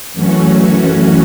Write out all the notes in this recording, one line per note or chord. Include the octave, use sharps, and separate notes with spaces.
F#2 E3 A3 C#4 F#4